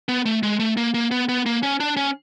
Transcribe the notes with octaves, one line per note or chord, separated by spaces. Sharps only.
B3
A3
G#3
A3
A#3
A#3
B3
B3
A#3
C#4
D4
C#4